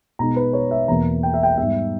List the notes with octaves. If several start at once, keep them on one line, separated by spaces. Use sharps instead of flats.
B2 G#3 B3 D#4 A#5
B4
C#5
E5
E2 B2 A#3 A#5
G5
E5
G5
G#2 G3 B3 E5